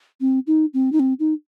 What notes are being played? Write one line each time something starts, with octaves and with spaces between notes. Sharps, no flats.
C4
D#4
C4
D#4
C4
D#4